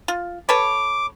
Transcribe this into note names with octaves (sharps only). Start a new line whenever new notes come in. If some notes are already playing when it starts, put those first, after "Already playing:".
F4
A4 B4 C#5 D6